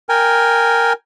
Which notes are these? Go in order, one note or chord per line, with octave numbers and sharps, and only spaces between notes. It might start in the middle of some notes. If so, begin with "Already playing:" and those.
A#4 G5 G#5